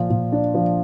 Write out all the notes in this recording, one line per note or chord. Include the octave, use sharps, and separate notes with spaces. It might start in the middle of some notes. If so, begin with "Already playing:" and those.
Already playing: A#2 F3
A#2
D4
F3